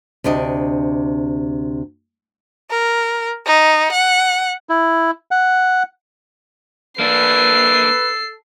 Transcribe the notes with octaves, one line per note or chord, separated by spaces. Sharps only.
D2 C3 D4 D#5
A#4
D#4
F#5
E4
F#5
A#3 D4 A4 B4 C7